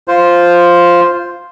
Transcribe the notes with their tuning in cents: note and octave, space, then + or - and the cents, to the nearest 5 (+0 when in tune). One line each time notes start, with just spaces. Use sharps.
F4 +0 C5 +0